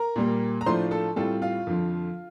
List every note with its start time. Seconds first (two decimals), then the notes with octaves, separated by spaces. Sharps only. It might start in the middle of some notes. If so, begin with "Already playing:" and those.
Already playing: A#4 A#5
0.16 A#2 G3 A#3
0.61 A#5
0.66 A2 F3 A3 D4 F4 C5 C6
0.91 A4 A5
1.16 A2 G3 C4 F4 A4 A5
1.42 F4 F5
1.67 F2 D3 F3